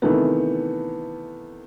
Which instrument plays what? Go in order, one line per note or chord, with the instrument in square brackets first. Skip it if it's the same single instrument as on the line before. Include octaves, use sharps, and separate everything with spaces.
[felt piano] C3 D#3 E3 A3 B3